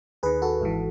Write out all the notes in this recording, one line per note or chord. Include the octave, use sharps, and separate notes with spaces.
D#2 D#3 G#4 B4
F#4 A4
G#1 G#2 E3